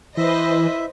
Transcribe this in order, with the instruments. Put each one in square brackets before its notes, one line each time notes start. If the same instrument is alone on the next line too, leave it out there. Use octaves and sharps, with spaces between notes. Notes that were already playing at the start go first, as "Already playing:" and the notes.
[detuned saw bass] E3 [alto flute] E4 [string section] B4 C5 D#5 [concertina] E5